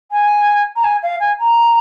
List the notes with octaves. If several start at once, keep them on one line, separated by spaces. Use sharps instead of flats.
G#5
A#5
G#5
F5
G#5
A#5